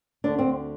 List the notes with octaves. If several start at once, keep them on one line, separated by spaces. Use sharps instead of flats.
D2 D3 D4
C4